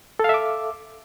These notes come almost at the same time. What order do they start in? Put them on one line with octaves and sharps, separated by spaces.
A4 F5 E5 D6